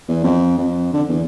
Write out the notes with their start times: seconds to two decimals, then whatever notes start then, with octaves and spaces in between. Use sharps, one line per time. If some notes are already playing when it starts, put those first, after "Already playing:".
0.08 E2
0.24 F2
0.58 F2
0.93 D3
1.08 E2